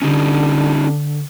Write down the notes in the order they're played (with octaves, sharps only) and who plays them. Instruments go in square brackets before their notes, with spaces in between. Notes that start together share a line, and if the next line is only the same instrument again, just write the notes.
[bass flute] D3 [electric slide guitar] C#4 D#4 G4